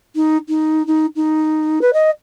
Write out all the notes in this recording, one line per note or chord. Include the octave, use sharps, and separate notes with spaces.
D#4
D#4
D#4
D#4
B4
D#5